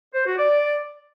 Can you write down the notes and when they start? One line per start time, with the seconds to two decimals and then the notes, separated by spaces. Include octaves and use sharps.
0.14 C5
0.26 F#4
0.38 D5